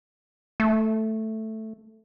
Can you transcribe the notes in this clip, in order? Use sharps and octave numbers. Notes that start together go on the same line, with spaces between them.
A3